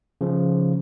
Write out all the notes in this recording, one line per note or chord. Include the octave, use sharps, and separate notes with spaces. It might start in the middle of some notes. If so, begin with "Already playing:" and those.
C#3 F3